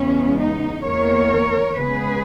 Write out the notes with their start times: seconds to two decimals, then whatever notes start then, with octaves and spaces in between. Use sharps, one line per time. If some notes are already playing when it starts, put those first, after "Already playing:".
Already playing: E2 C#3 G#3 B3 C#4
0.38 D#4
0.83 E2 D#3 A#3 A#4 C#5
1.76 C#3 G#3 B3 G#4 B4